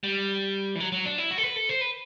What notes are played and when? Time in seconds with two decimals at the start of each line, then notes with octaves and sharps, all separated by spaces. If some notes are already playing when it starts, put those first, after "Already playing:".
0.03 G3
0.75 E3
0.80 F#3
0.92 F#3
1.05 D4
1.18 E4
1.31 F#4
1.38 A4
1.43 B4
1.56 A4
1.69 C5
1.81 B4